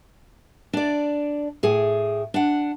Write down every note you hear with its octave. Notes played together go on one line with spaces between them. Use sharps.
D4 D5
A2 G#4
D4 F#5